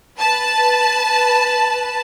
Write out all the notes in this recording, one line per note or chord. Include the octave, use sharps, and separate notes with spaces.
B4 A5